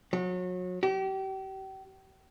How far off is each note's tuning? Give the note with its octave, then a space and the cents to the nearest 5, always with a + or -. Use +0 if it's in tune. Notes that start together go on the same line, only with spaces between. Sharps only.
F#3 -30
G4 -35